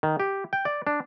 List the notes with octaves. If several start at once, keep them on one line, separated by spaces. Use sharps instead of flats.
D#3
G4
G5
D5
D4